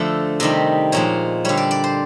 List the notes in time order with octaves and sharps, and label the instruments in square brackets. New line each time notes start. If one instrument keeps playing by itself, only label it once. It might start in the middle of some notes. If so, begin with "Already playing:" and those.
Already playing: [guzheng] D3 F3 A3
C3 D#3 G3 D#5
A#2 F3 G#3 C#5
D3 G3 C#5
D5
D5
C5